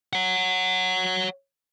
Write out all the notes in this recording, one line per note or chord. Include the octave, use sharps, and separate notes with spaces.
C#5 F#5